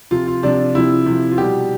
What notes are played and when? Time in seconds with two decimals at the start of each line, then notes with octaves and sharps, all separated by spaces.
0.11 C3 F3 F4
0.27 F4
0.43 C3 F3 D4
0.75 C3 F3 E4
1.06 C3 F3
1.31 F4
1.38 B2 G3 G4